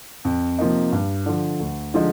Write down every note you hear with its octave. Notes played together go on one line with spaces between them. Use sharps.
F2
C3 F3 A#3 D#4
G2
D3 F3
D2
D3 F3 G#3 D#4